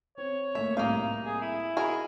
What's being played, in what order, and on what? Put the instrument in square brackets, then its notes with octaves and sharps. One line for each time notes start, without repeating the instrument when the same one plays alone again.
[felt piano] C4 [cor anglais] C#5
[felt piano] A3 A#3 [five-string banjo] E5
[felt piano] C2 A2 G3 [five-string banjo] A#3 F5 [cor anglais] D#4
[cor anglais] G#4
E4
[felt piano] F#4 D#5 B5 [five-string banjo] G#4 A#4